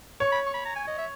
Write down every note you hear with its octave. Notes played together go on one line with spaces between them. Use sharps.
C#5 C#6
B5
C#6
B5
A#5
G#5
D#5
E5